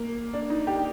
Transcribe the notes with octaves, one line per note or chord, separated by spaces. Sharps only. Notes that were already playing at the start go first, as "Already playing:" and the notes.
Already playing: A#3
D4
D#4
G4